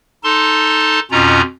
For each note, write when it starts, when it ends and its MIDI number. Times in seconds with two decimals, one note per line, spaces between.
0.24 1.00 63
0.24 1.00 69
0.24 1.00 81
0.24 1.00 84
1.11 1.41 41
1.11 1.41 47
1.11 1.41 61
1.11 1.41 65
1.11 1.41 82